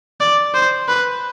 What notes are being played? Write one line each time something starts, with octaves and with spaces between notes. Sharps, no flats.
D5
C5
B4